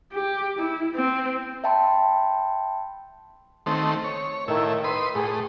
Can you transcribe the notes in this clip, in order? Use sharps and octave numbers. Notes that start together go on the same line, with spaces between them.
G4
E4
C4
E5 G5 A5 B5 C6
D#3 A3 C4
C#5
A2 D#3 E4
B4 C6 D#6
A2 G#4